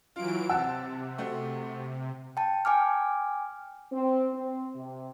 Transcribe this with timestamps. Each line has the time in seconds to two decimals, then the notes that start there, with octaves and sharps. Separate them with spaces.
0.16 E3 F#3 F4 D7
0.49 C3 F#5 A5 E6
1.18 A3 C4 F#4
2.37 G5 A5
2.65 G5 G#5 D6 F6
3.92 C4
4.33 C4
4.75 C3